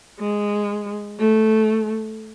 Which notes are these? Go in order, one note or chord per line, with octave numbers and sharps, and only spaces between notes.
G#3
A3